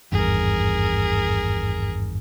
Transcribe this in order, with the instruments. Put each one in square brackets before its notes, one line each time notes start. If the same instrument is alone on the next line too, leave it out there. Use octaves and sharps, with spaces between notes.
[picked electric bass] G#1 E2 G2 [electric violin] G#4 A#4